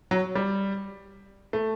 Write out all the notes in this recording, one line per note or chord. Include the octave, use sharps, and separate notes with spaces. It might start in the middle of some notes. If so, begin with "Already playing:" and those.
F#3
G3
A3